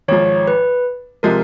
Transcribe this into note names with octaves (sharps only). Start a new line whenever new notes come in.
G#1 G#2 F3 C#5
B4
C3 F3 G#3 A#4